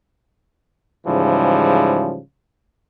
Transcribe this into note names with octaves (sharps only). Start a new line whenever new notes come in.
G#2 C#3 E3 F3 G3